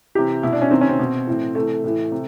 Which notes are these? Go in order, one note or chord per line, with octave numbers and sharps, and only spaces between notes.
C3 E3 G4
B2 E4
D4
C#4
C3 D#3 C4
C#4
C4
B2
A2 E3
C3 E3 A3
A2 E3
C3